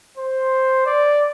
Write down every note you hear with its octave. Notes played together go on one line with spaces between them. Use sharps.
C5
D5